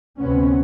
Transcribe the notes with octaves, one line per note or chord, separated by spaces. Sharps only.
D2 C3 B3 C#4